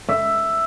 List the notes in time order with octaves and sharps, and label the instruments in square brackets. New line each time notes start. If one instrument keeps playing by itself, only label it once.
[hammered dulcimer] E5